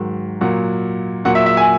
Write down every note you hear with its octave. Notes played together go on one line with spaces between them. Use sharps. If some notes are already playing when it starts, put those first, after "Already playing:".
Already playing: G#2 D#3 F#3
A#2 F#3 F#5
A#2 F#3 F#5
E5
E5
G#5